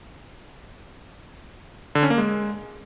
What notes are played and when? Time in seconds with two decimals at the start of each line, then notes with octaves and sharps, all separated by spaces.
1.95 D3
2.03 C#4
2.10 A#3
2.18 G#3